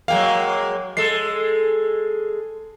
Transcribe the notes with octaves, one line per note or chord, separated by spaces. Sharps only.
F#3 G#3 A#3 F5 G5
G#3 A4 C7